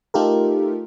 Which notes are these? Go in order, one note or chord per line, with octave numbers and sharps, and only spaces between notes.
A3 D#4 F4 G4 A4 A#4